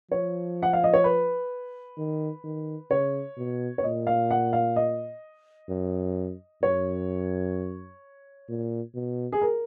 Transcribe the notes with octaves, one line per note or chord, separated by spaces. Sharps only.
F3 C#5
F#5
F5
D#5
C#5
B4
D#3
D#3
C#3 C#5
B2
C#5
A#2 D#5
F5
F#5
F5
D#5
F#2
F#2 C#5
A#2
B2
G#4
A#4